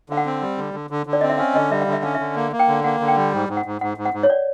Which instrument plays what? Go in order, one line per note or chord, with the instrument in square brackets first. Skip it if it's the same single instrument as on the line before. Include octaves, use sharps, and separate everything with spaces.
[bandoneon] D3 [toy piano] F5
[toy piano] F#5
[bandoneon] C4
G3
D3
D3
D3
D3
[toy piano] D5
[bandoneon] C4 [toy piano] D#5
[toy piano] E5
[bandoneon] C#4 [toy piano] F5
[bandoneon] D3 [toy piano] D#5
[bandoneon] G3 [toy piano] E5
[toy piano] F5
[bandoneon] D3
[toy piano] E5
[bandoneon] C#4 [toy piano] F5
[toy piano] E5
[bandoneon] D3
A#3
A#3
[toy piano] G5
[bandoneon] D3
[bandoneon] A#3 [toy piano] F#5
[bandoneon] D3
[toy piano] G5
[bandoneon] G3
G#2
G#2
[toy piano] F#5
[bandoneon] G#2
[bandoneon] G#2 [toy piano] F#5
[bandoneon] G#2
[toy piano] F#5
[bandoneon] G#2
[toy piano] C#5
D5